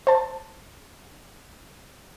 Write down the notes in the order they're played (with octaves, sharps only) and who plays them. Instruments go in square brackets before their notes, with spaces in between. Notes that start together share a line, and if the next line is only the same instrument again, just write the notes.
[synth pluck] C5 A5